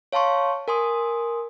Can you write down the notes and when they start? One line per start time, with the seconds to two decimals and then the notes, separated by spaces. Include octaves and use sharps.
0.13 C#5 F5 A5 C6 C#6
0.68 A#4 G#5 C6 D#6